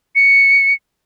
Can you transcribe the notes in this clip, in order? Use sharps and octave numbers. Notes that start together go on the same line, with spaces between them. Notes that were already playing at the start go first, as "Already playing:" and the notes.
C#7